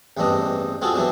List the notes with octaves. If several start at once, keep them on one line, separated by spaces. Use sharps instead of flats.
A1 E2 G2 C4 D4 D#5
C4 F4 F#4 G#4 A4
E3 F#3 B3 C4 D4